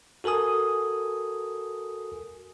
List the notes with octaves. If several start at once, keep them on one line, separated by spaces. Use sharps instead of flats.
F#4 A4 A#4 G#5 D#6